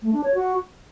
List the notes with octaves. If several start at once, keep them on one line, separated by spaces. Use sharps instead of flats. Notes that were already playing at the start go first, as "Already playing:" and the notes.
A3
D4
C#5
F#4